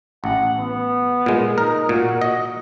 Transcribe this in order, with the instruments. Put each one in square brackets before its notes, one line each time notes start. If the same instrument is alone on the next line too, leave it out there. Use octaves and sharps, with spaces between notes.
[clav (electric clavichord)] A1 [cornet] F#5
[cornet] B3
[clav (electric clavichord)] A#2 G#3
[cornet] D#4 [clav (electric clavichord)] A#4
[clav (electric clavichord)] A#2 [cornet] F#4
[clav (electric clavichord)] D#5